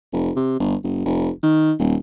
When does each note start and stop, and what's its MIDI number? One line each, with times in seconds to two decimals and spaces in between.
0.13 0.31 29
0.36 0.58 48
0.60 0.75 31
0.84 1.02 30
1.05 1.29 29
1.43 1.72 51
1.79 1.96 27